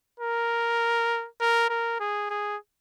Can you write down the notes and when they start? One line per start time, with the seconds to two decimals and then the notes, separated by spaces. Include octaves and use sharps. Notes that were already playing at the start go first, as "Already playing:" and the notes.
0.20 A#4
1.40 A#4
1.69 A#4
2.00 G#4
2.30 G#4